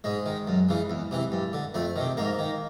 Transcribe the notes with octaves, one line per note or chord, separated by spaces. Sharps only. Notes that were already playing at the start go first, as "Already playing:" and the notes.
G#2 G#3
D#3
F#2
C#3 E3
E2
C3 E3
G2
D3
F2 A3
C3 D#3
G#2 A#3
D#3